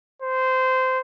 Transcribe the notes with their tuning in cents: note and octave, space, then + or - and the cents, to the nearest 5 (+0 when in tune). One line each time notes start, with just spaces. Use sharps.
C5 -15